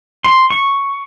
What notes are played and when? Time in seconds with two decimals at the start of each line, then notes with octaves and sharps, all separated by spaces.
0.24 C6
0.50 C#6